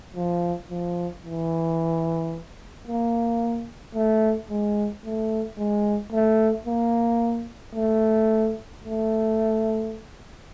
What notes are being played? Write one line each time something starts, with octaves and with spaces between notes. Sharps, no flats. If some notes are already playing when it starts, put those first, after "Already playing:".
F3
F3
E3
A#3
A3
G#3
A3
G#3
A3
A#3
A3
A3